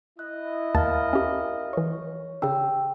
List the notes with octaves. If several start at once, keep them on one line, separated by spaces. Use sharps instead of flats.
E4 D#5 F#6
D#2 A#4 F5 A5 F6 A6
C#4 G4
E3 C#5 C#6
C#3 D4 G4 G5 E6